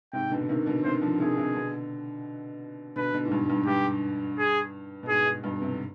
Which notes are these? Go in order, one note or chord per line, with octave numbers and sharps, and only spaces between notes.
G#2 C3 G5
B2 D3
D3
C3 D#3
B2 D3
C3 D#3 C5
D3 F3
C3 D#3 G#4
C3 D#3
B2 D3
B2 D3 B4
B2 D3
G#2
G2 B2
G2
G2 G4
G#4
B2
G#2 G#4
G#2
G2 B2
C3
D3